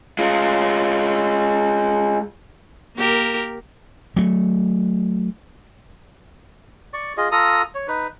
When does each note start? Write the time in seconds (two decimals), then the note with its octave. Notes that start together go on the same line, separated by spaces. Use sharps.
0.19 G#3 F4
2.96 A#3 G4 A#4
4.16 F#3 A3
6.93 D5 C#6
7.17 F4 G#4 D#5
7.32 F4 A4 A#5 D#6
7.75 C#5
7.88 D#4 B4